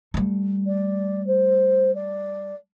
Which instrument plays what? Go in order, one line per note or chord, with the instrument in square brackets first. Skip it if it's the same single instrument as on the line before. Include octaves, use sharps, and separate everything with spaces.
[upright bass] G3 A3
[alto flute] D5
C5
D5